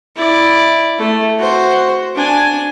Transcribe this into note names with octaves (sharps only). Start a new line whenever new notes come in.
E4 D5
A3
F#4 C5
D4 G#5